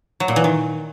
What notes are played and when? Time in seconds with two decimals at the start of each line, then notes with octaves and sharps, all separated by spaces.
0.20 F#3
0.28 A#2
0.36 E3
0.44 D#3